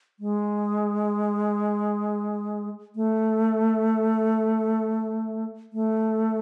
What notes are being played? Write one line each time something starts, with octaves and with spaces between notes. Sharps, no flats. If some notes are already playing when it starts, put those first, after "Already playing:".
G#3
A3
A3